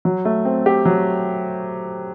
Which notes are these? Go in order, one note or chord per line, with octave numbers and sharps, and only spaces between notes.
F#3
A3
C4
G4
F#3